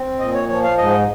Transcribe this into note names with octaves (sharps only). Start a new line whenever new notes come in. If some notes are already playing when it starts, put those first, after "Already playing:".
Already playing: C4
A#2 D#5
C#5
F3 C#5
F5
G#2 D#5